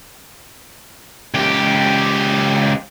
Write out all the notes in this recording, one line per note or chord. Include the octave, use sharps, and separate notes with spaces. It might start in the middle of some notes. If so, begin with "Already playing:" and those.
C#2 G4